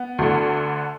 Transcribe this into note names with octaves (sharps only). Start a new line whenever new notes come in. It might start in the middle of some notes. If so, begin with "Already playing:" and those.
Already playing: B3
D2 D3